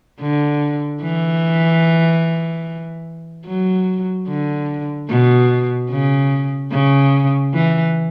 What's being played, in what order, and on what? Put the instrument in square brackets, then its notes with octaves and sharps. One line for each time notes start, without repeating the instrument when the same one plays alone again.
[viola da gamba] D3
E3
F#3
D3
B2
C#3
C#3
E3